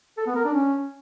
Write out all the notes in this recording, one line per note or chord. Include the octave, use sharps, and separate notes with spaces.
A4
B3
A#4
D4
C#4